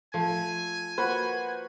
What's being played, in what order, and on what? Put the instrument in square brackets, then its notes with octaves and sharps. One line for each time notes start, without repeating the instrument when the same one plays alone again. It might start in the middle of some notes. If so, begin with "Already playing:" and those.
[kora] F3 [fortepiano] A3 [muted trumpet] G#5
[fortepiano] A#3 F#4 C5 [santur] B4